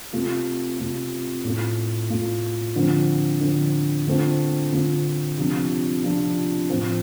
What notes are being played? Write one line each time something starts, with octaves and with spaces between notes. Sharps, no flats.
C3 A3 F4
C3 A3 F4
A2 A3 F4
A2 A3 F4
D3 F3 C4
D3 F3 C4
D3 A3 C4 F4
D3 A3 C4 F4
C3 F3 D4 F4
C3 F3 D4 F4
A2 F3 C4